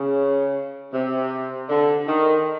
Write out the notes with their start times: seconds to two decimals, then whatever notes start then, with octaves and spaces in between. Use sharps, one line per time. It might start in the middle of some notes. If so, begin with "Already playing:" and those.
Already playing: C#3
0.93 C3
1.69 D3
2.08 D#3